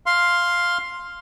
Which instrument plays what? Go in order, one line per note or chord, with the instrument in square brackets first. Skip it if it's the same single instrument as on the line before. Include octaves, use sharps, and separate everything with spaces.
[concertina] F5 C6